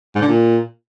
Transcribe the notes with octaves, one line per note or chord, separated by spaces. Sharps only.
G#2
D3
A#2